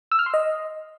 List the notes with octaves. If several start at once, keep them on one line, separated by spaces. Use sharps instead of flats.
E6
F6
C6
D#5